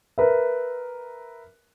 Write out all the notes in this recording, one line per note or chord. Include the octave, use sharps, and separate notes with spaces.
A#4 B4 E5